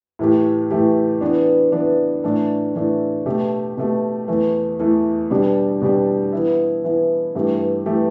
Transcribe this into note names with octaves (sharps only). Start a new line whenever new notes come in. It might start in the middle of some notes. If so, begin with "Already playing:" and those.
A2 E3 A3 G4
A2 E3 A3 G4
E3 B3 D4
E3 B3 D4
A2 E3 A3 D4
A2 E3 A3 D4
B2 A3 G4
B2 A3 G4
E2 E3 A3
E2 E3 A3
B2 G3 D4 G4
B2 G3 D4 G4
E3 B3 E4
E3 B3 E4
G2 E3 A3 G4
E3 A3 G4